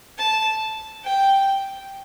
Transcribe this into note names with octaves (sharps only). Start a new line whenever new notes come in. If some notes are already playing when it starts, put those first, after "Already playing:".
A5
G5